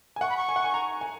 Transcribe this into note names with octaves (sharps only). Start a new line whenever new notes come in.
G#5
F#5 C#6
B5
C#6
G#5
F#5
G#5
A#5
G#5